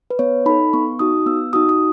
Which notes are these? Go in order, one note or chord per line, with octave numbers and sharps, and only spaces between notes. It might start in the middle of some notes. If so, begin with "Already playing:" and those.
B4
B3 C#5
D#4 A4 B5
B3 C#6
D#4 F#4 D#6
B3 E6
D#4 F#4 D#6
D#6